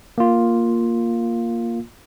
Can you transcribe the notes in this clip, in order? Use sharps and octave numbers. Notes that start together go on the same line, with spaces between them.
A#3 F4